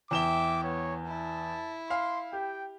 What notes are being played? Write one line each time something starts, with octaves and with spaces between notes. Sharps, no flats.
E2 E5 G5 D6 E7 G7
B3 C#5
E4 A5
F5 C6
G4 G5